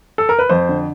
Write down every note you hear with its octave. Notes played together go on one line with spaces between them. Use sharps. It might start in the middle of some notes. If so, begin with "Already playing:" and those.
A4
A#4
B4
F2 C5
D3